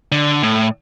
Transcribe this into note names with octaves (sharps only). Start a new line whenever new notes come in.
D3
A2